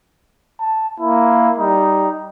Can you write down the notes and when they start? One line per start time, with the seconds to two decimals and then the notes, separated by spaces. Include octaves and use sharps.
0.60 A5
1.00 A#3 E4
1.58 G3 D#4